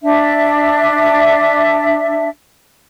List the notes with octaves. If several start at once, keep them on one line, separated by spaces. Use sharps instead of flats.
D4 E5